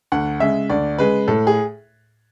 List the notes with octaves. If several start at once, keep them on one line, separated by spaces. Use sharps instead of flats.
D2 F#5
C#3 G#3 E5
D2 D5
C#3 G#3 B4
A2 A4
G#4